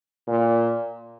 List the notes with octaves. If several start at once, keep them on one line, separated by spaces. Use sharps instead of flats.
A#2